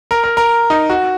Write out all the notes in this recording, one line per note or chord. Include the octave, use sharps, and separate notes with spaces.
A#4
A#4
A#4
D#4
F#4